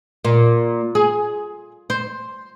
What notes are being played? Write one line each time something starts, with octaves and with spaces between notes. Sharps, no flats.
A#2
G#4
C5